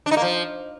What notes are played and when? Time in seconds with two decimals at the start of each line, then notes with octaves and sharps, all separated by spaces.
0.06 D4
0.11 D#4
0.17 A#3
0.22 F3